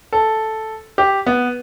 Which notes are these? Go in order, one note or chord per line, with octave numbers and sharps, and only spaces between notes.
A4
G4
B3